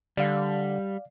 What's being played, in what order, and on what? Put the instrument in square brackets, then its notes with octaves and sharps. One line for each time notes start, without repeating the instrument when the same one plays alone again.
[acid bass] D3 [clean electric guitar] G3 [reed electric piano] D5 F5